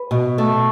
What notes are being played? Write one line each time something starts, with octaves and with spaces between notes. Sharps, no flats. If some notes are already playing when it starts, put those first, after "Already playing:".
Already playing: B4
B2
A3